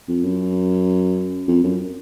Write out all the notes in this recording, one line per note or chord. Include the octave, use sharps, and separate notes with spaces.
F2
F#2
F2
F#2